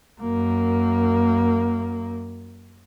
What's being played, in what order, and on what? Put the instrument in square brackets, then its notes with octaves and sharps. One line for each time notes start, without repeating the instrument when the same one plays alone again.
[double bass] F#2 A#3